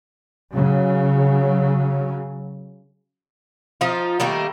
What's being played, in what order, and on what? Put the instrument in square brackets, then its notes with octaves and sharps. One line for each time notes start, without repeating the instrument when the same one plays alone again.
[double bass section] C#3 F#3
[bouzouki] F3 D#4 F4
D#3 G3 A3 A#3